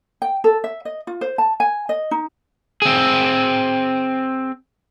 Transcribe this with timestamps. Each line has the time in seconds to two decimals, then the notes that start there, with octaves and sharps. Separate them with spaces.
0.22 G5
0.44 A4
0.64 E5
0.85 D#5
1.07 F4
1.21 C5
1.38 A5
1.60 G#5
1.89 D#5
2.11 D#4
2.82 C4 G#4